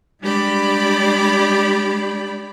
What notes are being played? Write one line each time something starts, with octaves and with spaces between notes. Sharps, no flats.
G3 G#3 D4 G4 D5 B5